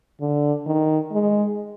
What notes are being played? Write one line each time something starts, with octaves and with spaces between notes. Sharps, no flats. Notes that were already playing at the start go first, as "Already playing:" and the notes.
D3
D#3
G#3